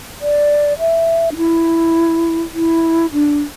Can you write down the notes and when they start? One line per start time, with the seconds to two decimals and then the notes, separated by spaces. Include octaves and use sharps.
0.21 D5
0.79 E5
1.31 D4
1.37 E4
2.54 E4
3.13 D4